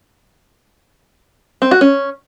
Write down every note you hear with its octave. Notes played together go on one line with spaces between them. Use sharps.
C4
F#4
C#4